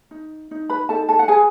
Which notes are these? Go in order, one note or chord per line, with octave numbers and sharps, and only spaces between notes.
D#4
D#4
B4 B5
D#4 A4 A5
A4 A5
F#5
G#4 B4 G#5